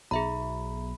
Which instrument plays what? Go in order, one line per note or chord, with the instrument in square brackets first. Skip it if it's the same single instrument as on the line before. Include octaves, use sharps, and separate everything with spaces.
[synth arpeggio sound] B1 [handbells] G#4 E5 A#5 [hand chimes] B5